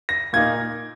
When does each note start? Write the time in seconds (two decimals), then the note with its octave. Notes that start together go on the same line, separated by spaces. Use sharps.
0.09 A#6
0.33 A#2 A#3 D#4 G#6